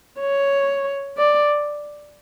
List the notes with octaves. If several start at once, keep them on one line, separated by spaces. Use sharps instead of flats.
C#5
D5